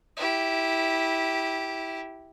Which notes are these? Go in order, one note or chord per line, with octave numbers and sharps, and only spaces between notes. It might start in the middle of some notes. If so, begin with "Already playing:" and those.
E4 G4